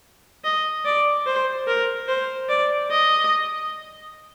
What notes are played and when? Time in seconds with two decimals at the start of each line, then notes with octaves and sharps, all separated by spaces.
0.44 D#5
0.85 D5
1.26 C5
1.67 A#4
2.08 C5
2.49 D5
2.91 D#5